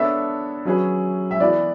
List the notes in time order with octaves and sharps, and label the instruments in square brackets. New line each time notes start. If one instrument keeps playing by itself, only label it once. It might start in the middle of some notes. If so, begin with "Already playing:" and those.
Already playing: [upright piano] B3 D4 A4 C#5 [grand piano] E5
[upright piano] F#3 C#4 G#4 B4
[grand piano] E5
[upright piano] E3 B3 E4 B4 [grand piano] D5